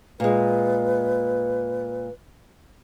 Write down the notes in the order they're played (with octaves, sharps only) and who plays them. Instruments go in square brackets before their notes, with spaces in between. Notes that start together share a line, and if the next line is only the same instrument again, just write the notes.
[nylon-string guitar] A#2 G#3 [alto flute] B4